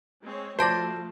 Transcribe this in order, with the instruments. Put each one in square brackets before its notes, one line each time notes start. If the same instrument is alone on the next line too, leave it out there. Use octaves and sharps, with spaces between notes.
[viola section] G#3 C4 C#5
[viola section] F3 A3 [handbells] F#4 A5 A#6 [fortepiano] C5 D5